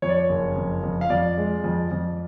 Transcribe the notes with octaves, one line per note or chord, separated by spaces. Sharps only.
F2 C#5
D5
C#5
F#1
F2
F2
F5
F2 D5
G#3
F2
F2